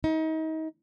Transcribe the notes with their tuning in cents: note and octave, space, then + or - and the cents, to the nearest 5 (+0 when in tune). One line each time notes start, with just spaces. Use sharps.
D#4 +35